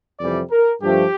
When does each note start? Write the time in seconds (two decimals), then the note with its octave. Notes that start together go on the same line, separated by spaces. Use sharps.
0.19 F2 C3 E3 G3 D5
0.51 A#4
0.82 G2 F3 A3 G4